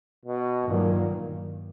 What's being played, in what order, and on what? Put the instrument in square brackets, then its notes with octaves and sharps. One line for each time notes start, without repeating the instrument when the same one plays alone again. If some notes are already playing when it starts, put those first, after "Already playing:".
[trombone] B2
[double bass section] G2 D#3 F#3 A#3 [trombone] A#2